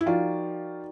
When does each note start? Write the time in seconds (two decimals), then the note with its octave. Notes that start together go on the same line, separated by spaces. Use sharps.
0.01 E4
0.06 F3 D#4 F4 F#4 A#4 D5 G5